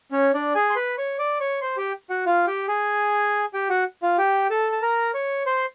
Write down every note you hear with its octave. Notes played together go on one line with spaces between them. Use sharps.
C#4 C#5
D4 D5
G#4 G#5
C6
B4 B5
C#5 C#6
D5 D6
C#5 C#6
C5 C6
G4 G5
F#4 F#5
F4 F5
G4 G5
G#4 G#5
G4 G5
F#4 F#5
F4 F5
G4 G5
A4 A5
A5
A#4 A#5
C#5 C#6
C5 C6